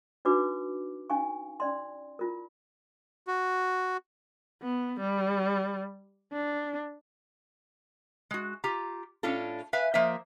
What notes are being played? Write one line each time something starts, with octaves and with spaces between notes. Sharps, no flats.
D4 D#4 F#4 B4 D6
C#4 D#4 F5 G#5 C#6
C#4 D5 C6
E4 F4 A#4
F#4
B3
G3
D4
G#3 F#4
F4 G4 A#5
A2 C#4 D4 F4 A4
B4 E5 F5 G#5
F3 A#3 C5 D#5 E5